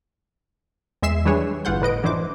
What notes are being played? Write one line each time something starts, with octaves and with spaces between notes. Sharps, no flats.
E2 G#3 E5 C7 E7
E3 G3 D4 G#4 B4 C#5
G1 E3 F4 F#5 G6
A2 B4 D#5 D7
F#2 E3 D4 E4 C5 D6